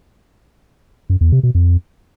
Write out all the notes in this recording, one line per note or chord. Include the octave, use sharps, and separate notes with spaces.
F#2
E2
C3
B2
F2